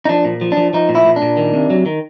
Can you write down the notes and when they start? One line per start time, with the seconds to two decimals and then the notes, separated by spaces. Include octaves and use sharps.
0.05 D#4
0.09 F3 D4
0.25 A#2
0.41 F3
0.52 D4
0.57 F3
0.73 F3 D#4
0.89 A#2
0.95 E4
1.06 A#2
1.16 D4
1.22 A#2
1.37 D#3
1.54 C3
1.70 F#3
1.86 D#3